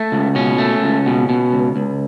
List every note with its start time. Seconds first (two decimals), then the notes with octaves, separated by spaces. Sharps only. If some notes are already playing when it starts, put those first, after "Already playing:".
Already playing: A3
0.12 C#2
0.35 B2 C#4
0.58 A3
0.83 C#2
1.06 B2
1.29 B2
1.52 C#2
1.76 C#2